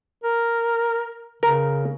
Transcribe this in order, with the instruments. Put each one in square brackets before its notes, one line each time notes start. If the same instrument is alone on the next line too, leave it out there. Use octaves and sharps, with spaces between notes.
[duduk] A#4
[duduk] C#3 [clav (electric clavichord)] A#4